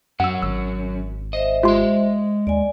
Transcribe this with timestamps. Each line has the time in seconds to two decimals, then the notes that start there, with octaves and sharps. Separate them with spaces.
0.20 F#2 F#3 C#4 F#5 E6
0.42 G#1 E6
1.33 C5 D#5 E5
1.63 G#3 F4 G4 D#5 C6
2.47 D#2 D5 G#5